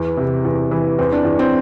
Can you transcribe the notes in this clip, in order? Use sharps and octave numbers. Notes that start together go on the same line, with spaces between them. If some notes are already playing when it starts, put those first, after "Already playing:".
Already playing: E2 E3
C3
E2
E3
E2 C4
D4
E2
C4